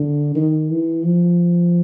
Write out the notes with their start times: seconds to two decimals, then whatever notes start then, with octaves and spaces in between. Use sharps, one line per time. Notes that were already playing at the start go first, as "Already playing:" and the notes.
Already playing: D3
0.35 D#3
0.70 E3
1.04 F3